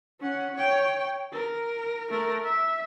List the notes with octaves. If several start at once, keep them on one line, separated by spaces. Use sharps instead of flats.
C#4 F#5
C#5 G5
A#4
A3 A#4
E5